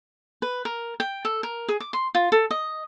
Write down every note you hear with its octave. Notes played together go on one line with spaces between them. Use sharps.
B4
A#4
G5
A4
A#4
G#4
D6
C6
F4
A4
D#5